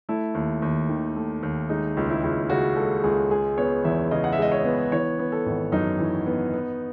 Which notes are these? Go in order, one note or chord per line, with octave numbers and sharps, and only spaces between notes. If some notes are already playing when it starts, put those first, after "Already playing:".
A3 E4
D#2
D#2
D#3
A3
D#2
G#3 D#4
C#2
E4
C#2
C#3 F#4
G#3 A4
C#2 G#4
G#3 G#4
B3 C#5
E2 E5
C#3 D#5
F#5
E5
G#3 D#5
C#5
B3
E3 C#5
B3
A4
G#1
F#2 D#4
E3
B3
B3